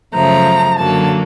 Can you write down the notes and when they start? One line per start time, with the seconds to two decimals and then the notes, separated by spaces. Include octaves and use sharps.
0.13 F#2 C#3 F3 A3 A#5
0.78 F#2 D3 F#3 A#3 A5